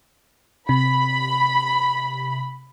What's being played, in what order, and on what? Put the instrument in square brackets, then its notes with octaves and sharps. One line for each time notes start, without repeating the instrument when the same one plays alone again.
[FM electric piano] C3 [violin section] B5